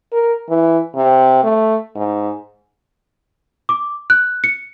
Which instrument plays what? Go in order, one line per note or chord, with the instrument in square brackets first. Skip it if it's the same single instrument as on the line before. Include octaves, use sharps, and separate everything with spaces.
[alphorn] A#4
E3
C3
A3
G#2
[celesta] D6
F#6
C#7